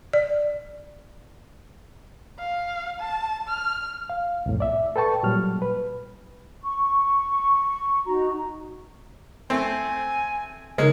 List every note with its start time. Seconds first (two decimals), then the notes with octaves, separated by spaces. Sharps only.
0.13 D5
2.39 F5
3.00 A5
3.48 F6
4.10 F5
4.46 C2 F2 A2
4.60 D5 E5
4.96 A4 B4 G5 A5 C#6
5.23 A#2 F#3 G3 F6
5.62 B4
6.63 C#6
8.06 D#4 F#4 A#5
9.50 A3 C4 G#5
10.78 C#3 G#3 A#3 D#4